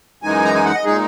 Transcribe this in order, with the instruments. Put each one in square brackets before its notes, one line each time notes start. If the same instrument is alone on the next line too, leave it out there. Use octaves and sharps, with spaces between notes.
[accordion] F#2 E3 G#3 D#4 G#5
A#5
G#5
F#5
D#5
A#2 G#3 D#4 G#4